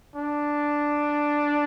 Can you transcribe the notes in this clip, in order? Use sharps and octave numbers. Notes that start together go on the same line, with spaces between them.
D4